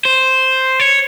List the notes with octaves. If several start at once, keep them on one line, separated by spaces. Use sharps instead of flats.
C5
C#5